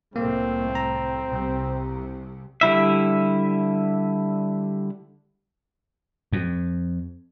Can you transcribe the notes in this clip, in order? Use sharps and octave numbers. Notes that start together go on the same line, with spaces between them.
C2 A2 A3 A#3 C4
A#5
C2 C3
D3 G3 E4 E5
F2